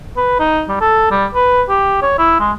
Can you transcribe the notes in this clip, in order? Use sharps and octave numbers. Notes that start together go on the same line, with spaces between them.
B4
D#4
G3
A4
G3
B4
G4
C#5
E4
G#3